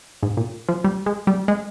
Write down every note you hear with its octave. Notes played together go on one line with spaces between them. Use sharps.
G#2
A#2
F3
G3
G#3
G3
G#3